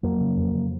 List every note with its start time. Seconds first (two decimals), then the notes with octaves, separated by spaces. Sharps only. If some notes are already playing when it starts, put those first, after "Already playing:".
0.03 F2 F#3 A#3
0.21 C#3
0.37 F2
0.54 C#3